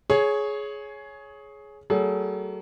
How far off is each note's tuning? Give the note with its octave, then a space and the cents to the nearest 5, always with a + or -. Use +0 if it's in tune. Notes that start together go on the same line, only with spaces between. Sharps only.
G#4 +15 C#5 +0
F#3 +40 A3 +35 G#4 +35